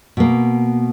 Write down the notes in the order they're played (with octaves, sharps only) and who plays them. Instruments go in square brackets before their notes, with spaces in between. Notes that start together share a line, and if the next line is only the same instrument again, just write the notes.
[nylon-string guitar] B2 A#3